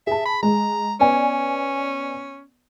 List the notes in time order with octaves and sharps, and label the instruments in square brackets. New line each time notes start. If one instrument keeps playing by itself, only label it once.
[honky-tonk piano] G#4 A5 [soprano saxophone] E5
[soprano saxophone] B5
[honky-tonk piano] G#3 [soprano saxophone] A#5
[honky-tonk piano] B3 D5 G#5 [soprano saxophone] C#4